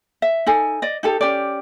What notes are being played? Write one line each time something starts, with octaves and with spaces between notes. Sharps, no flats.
E5
D#4 A4 G#5
D5 D#5
D#4 G4 A4
C#4 G4 D5